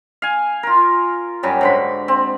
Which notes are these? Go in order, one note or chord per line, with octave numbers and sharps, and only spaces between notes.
F5 G#5
F4 A#4
F#2 F#3 G3
G#2 D3 B5
C4